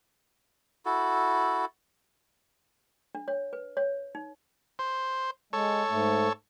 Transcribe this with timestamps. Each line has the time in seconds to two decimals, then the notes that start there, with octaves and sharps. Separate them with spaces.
0.86 E4 F#4 A4
3.15 D4
3.28 C#5
3.53 B4
3.77 C#5
4.15 D#4
4.79 C5
5.53 G#3 A4 C#5
5.90 G#2 A3